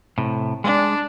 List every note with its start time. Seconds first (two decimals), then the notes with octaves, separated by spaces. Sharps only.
0.18 A2 C3
0.64 G#3 D4